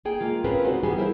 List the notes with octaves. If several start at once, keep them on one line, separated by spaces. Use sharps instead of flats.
A#3 G#4 G5
G#3 A#3 F4
C4 C#4 F4 G#4 A#4 B4
G#3 D#4 F#4 C5
E3 G3 B3 F#4 G#4
E4 A#4 C5 E5